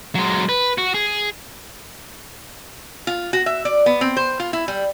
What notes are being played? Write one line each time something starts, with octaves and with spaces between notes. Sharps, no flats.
F#3 G#3
B4
F#4
G#4
F4
F#4
E5
D5
B3
C4
C5
F4
E4
G3